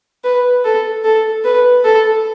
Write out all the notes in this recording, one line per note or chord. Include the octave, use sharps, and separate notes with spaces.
B4
A4
A4
B4
A4